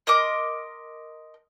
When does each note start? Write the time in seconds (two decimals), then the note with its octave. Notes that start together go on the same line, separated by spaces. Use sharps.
0.07 A#4 D#5 C6 D6